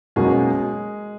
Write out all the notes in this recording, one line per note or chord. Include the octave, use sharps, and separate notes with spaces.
B2 F#3 G#3 A#3 C#4 G#4